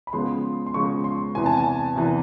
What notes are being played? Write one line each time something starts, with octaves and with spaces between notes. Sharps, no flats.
B5
C#3 F3 G#3 B3 C6
C6
C#3 F3 G#3 B3 C#6
C6
E2 C3 E3 G#5
A5
G#5
E2 C3 E3